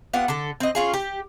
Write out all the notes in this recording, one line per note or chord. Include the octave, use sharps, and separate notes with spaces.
B3 F4 G4 F#5
D3 A4
C4 D#5
C#4 F4 G#4
G4